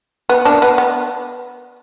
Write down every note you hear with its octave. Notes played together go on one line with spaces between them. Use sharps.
B3
A#3 D4
B3
B3